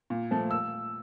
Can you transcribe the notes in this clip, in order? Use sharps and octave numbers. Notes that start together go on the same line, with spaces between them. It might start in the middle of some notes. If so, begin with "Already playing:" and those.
A#2
F3 A3
E6